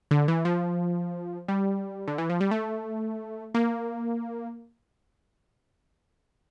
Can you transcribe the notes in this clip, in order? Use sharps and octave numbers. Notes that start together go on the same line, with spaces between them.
D3
E3
F3
G3
D3
E3
F3
G3
A3
A#3